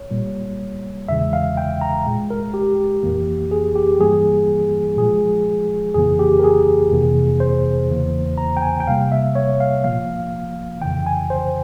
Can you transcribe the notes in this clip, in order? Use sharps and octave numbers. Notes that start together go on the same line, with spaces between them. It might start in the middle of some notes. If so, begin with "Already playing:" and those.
Already playing: C#5
A#2 G3 A#3
E2 C#3 E3 G#3 E5
F5
G5
A#5
A#2 G#3
A#4
G4
F2 E3 A#3
G#4
G4
G2 E3 G3 A#3 G#4
A#2 F3 G#3 G#4
F2 C#3 E3 A#3 G#4
G4
A#4
G#4
F2 C3 E3 A#3
C5
E2 C#3 E3 A#3
A#5
G5
G#5
G5
C3 G3 A#3 F5
E5
C#5
F5
A#2 F3 A#3 F5
F2 C#3 E3 G5
G#5
C5